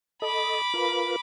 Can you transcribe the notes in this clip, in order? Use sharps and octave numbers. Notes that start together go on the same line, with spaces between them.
A4 D#5 B5 D6
F4 A#4 B4